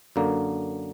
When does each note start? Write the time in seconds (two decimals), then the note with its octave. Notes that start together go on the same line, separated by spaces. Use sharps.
0.16 F#2 D3 A#3